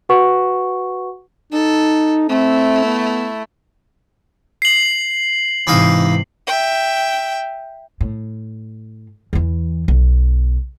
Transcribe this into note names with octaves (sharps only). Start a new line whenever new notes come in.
F#4 B4 F#5 C#6
D#4 A4
A3 C4 E4
B3
C7 F#7
G#2 C3 E3 D#4 F5
E5 G5
A2
E2 E3
B1